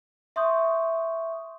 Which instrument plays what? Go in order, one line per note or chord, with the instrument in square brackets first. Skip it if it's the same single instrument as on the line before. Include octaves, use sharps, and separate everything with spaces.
[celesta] E5 C6 C#6 D#6 G6